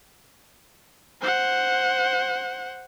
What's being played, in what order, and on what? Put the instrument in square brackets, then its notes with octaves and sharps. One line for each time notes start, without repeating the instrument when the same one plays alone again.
[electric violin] C5 F#5